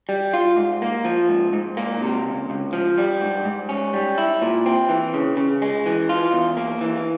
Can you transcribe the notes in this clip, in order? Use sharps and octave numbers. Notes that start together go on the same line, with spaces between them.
G3
F4
G#2
A#3
F3
G#2
G#2
A#3
C3
C#2
C#2
F3
G3
G#2
G#2
C#4
G3
E4
A#2
C4
E3
C#3
C#3
G#3
E3
F4
E2
A#3
E3